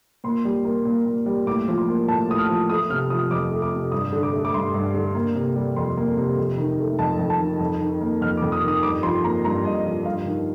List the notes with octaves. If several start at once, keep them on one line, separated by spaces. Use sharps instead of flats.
A#2 C6
G3
A#3
A#2
A#2
G3
A2 D6
F3
C6
A#3
A2 A5
A2 D#6
F6
F3
A3 D#6
C3 F6
F3 D#6
F2 D6
A3
D6
C3
G2 D#6
D3
D6
A3
D6
G2 C6
G2
D3
A#3
C3
G3
F2 C6
A#3
C3
F2
D#3
A3
F2 A5
F2
A5
D#3
F2
D#3
A#3
F2 F6
D6
F2
D#6
D#3
D#6
G2 D6
F3 C6
A#3 A#5
G2 A#5
G2 D#5
F3
G2 F5
D#3